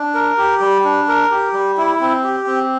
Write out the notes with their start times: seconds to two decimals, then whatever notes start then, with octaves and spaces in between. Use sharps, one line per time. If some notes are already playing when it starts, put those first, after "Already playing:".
Already playing: D4
0.14 A#4
0.37 G4
0.60 G3
0.84 D4
1.08 A#4
1.31 G4
1.53 G3
1.77 E4
2.00 C4
2.24 G4
2.47 C4